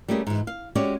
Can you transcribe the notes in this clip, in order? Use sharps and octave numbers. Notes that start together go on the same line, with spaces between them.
G3 A3 A#3 C#4 G4 G#4
G#2 E3
F5
G#3 C#4 F#4 G4 C#5 D5